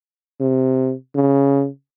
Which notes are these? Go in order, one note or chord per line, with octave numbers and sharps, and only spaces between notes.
C3
C#3